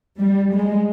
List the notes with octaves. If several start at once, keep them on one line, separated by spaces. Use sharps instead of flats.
G3
G#3